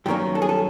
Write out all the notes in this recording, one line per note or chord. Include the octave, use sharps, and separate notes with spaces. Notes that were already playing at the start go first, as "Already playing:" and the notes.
G2 D#3 F#3 A#3 C#4 G4
A4
G#4
A4